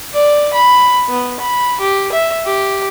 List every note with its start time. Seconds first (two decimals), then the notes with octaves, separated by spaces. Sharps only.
0.14 D5
0.53 B5
1.09 B3
1.40 B5
1.80 G4
2.12 E5
2.46 G4